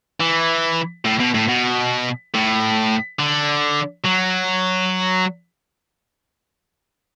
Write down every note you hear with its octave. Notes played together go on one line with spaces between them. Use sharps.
E3
A2
B2
A2
B2
A2
D3
F#3